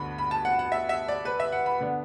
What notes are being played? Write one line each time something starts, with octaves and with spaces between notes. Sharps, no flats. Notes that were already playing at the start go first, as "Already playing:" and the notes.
Already playing: D2 D3 B3 D4 B5
B5
A5
F#5
F#5
E5
E5
D5
B4
E5
F#5
B5
D3 B3 D4